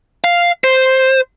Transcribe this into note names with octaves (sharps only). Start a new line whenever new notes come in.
F5
C5